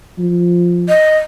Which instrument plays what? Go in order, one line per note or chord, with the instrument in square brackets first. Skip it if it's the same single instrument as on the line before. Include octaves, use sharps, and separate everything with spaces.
[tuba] F3
[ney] D#5